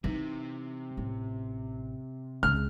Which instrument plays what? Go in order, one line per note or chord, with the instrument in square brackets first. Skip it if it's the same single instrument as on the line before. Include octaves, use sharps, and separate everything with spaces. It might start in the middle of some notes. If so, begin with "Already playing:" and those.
[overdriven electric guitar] C3 [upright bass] E3 D#4
[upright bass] A1
[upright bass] C#2 C#3 [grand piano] F6